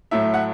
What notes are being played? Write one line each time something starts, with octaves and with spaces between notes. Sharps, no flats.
A2 F#3 A3 E5
F#5